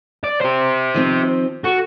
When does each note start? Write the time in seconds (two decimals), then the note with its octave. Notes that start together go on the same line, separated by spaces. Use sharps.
0.24 D5
0.41 G4 C5
0.94 D#3 F3 C4
1.64 F#4 A4